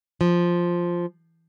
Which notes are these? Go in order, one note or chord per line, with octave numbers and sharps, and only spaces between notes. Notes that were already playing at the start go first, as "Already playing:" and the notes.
F3